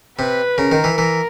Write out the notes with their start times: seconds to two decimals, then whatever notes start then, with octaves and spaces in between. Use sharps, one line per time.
0.19 C3 B4
0.58 C#3 A#4
0.72 D#3
0.84 E3
0.98 E3 A#4